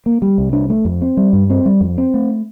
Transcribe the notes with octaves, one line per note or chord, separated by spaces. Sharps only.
A#3
G3
C2
D4
A3
F2
C4
G3
G2
C4
G3
F2
C4
A3